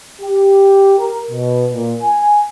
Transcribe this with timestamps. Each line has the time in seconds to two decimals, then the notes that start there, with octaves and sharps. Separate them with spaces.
0.21 G4
0.99 A#4
1.31 B2
1.72 A#2
2.02 G#5